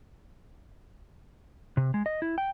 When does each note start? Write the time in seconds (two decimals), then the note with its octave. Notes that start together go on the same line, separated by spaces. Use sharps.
1.77 C3
1.94 G#3
2.06 D#5
2.22 E4
2.38 G5